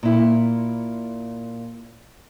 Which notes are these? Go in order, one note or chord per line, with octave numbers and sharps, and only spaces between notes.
A#2 E4